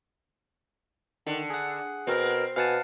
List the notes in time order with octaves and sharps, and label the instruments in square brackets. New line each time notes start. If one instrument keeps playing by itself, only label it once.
[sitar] D3 [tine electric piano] D#3
[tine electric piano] G#4 F#5
[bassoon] B2 [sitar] C4 [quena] A#4
[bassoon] B2 [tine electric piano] F5 F#5 A5 [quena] G#5